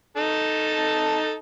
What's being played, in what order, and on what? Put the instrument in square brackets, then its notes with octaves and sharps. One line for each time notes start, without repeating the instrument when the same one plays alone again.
[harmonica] D#4 A4 A5